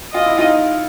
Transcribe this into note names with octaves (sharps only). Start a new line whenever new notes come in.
F4 D#5
E4
D#4 F4